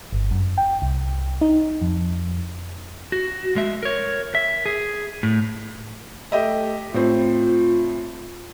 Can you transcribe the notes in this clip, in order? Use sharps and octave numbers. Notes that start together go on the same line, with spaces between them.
G1
F#2
G5
C2
D#4
F2
F#4
G#3 E5
A#4 C#5
E5
G#4
A2
A3 G4 D#5 E5
A2 C4 F4